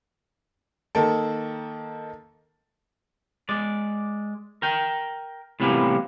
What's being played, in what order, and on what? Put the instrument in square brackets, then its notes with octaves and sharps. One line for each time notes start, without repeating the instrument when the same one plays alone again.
[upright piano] D#3 A#3 A4
[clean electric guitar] G#3 D5
A#4 G5
A2 C3 E3 G3 A#3 B3